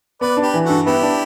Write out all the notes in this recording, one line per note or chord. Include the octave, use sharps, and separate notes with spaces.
B3 B4 D5
D4
G4 B4
E3
G2 F#4 A4
B3 E4 G4
D4